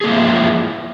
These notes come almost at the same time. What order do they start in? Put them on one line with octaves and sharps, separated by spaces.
G#4 A#3 G#3 F3 E4